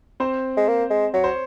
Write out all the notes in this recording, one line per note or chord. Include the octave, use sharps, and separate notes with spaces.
C4 C5
G#3
A#3
G#3
F#3 C#5
C5